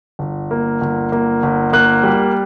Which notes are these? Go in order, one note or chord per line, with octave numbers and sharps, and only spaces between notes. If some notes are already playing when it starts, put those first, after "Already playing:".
G1
A#3
G1
A#3
G1
A#3 F#6
G3